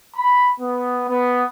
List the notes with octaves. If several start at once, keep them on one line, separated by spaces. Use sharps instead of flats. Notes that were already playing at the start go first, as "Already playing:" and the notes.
B5
B3
B3